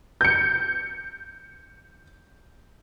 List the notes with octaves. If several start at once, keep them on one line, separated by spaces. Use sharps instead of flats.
G6 C#7